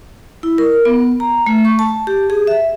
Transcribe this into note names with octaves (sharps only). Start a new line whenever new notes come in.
E4
A#4
B3
A#5
A3
C#6
A5
G4
G#4
E5